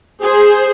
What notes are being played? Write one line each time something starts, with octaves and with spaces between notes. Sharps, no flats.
G#4 C5